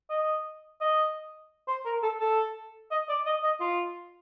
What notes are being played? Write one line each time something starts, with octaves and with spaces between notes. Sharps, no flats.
D#5
D#5
C5
A#4
A4
A4
D#5
D5
D#5
D#5
F4